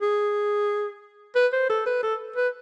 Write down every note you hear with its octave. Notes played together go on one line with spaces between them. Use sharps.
G#4
B4
C5
A4
B4
A4
B4